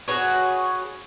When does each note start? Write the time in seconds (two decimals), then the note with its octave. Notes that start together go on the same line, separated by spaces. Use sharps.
0.08 F#4 G#4 B4 C#5